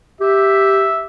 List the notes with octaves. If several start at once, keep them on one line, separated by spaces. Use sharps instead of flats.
G4 E5